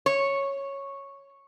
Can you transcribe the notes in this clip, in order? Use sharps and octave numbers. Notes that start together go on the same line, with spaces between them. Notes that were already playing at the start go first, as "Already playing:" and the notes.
C#5